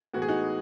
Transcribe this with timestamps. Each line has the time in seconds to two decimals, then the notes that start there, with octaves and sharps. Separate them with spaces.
0.14 A2 E3 G#3 B3 F#4
0.22 G#4
0.28 D#4 F#4